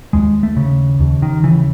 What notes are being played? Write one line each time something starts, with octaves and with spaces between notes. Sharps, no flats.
D#2 G#3
A3
C#3
D#2
D#3
C#3 E3